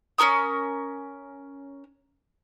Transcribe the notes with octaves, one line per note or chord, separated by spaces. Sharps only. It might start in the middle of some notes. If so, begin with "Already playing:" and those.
C#4 F#4 A#4 D#6